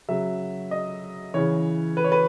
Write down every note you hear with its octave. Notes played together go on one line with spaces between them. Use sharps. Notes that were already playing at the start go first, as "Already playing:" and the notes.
C#3 F#3 E5
D#5
C#3 E3 C#5
B4
C#5
B4